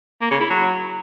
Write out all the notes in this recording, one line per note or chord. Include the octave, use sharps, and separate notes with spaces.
A#3
C#3
E4
F#3